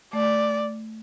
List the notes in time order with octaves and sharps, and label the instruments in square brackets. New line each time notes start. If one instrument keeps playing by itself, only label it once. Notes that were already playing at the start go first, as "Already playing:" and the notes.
[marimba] A3 [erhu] D5